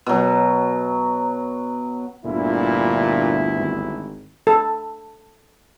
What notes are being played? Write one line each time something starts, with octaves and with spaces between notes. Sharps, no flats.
B2 F#3
G1 D2 A#2 E4
G#1
A4